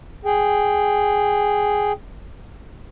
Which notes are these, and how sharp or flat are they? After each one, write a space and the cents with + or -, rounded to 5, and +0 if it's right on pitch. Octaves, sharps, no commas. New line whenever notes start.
G#4 +0 G5 +0